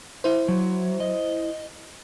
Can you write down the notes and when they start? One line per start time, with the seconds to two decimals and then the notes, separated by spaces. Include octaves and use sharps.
0.24 E4 C5
0.48 F#3
1.00 D#5